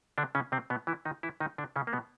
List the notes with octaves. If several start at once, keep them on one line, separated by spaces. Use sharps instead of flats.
D3 D4
C#3 C#4
C3 C4
B2 B3
E3 E4
D#3 D#4
E3 E4
D#3 D#4
D3 D4
C#3 C#4
A#3
B2 B3